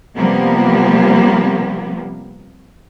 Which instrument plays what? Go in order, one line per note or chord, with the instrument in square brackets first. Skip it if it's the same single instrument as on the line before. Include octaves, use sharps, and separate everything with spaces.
[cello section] C3 F3 G3 A#3 B3